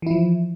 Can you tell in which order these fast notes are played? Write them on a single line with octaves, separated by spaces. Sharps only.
E3 E4 F3